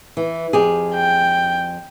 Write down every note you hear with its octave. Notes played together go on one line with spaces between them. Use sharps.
E3
F2 G4 G#4
G5